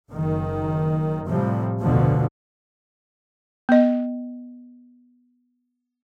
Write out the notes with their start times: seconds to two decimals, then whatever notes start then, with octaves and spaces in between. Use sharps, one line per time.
0.10 F#1 D#3
1.27 A2 C3 F3 G3
1.82 F1 D2 B2 D3 F3
3.69 B3 D#5